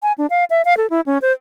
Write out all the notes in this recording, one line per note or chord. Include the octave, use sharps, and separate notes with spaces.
G#5
D4
F5
E5
F5
A4
E4
C#4
C5